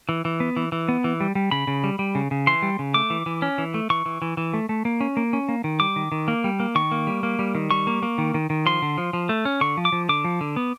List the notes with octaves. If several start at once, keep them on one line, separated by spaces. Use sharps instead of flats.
E3
E3
B3
E3
E3
B3
E3
G3
G3
C#3 B5
C#3
G3
G3
C#3
C#3
E3 C6
G3
C#3
A3 D6
E3
E3
C#4
E3
A3
E3 C#6
E3
E3
E3
A3
A3
A#3
C#4
A#3
C#4
A#3
D#3
G3 D6
D#3
D#3
A#3
G3
A#3
D#3 C#6
A#3
G3
A#3
G3
D#3
G3 C#6
A#3
A#3
D#3
D#3
D#3
F3 C6
D3
F3
F3
A3
C#4
D3 C#6
F3
D6
F3
D3 D6
F3
D3
B3